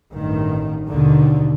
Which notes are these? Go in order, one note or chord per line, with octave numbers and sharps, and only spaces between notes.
A1 G2 D#3
D#2 B2 D3 D#3